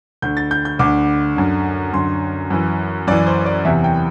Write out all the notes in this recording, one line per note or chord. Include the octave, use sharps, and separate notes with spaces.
D2 D3 G6
A6
G6
G6
D2 D3 D6
F#2 D3
F#2 D3 C6
F#2 E3
F#2 E3 D5
C5
D5
E2 C3 E3 E5
G5